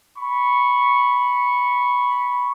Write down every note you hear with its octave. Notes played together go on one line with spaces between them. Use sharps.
B5 C#6